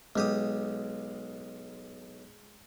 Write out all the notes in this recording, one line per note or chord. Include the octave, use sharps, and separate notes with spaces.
B1 G#3 G4 D#6